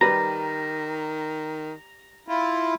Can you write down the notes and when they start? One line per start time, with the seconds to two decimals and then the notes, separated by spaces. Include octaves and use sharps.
0.01 D#3 G3 B4 A#5
2.28 E4 F4